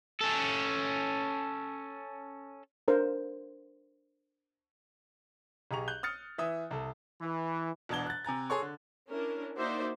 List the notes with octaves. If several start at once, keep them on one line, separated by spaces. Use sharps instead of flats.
C#4 A4
D4 A#4 C5
B1 G4 G#4 A#5 C#6 F7
F#6 G6 G7
D#6 F6 A6 C#7
E3 E5 D#6
C2 A4
E3
E1 B2 D4 A5 G#6 G7
F#6 A6
C3 G#5 A#5 A6
G#4 A4 C#5 C6 C#6
D3
C#4 D4 E4 A#4
A#3 D#4 F#4 C5 D5 E5